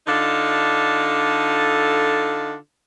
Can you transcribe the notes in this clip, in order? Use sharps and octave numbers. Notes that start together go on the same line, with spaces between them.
D3 D4 D#4 F4 A4